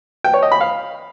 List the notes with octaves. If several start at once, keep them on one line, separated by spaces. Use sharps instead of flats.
G5
C#5
D#5
B5
F5